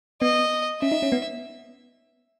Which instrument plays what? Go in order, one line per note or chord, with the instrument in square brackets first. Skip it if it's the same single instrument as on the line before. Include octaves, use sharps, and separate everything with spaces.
[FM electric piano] B3 [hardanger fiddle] D#5
[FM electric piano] C#4 [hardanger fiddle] E5
[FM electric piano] D#4
C#4
B3